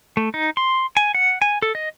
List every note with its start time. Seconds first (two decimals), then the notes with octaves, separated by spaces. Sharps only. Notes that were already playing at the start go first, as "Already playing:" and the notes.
0.17 A3
0.34 D#4
0.57 C6
0.97 G#5
1.15 F#5
1.42 G#5
1.62 A4
1.75 D#5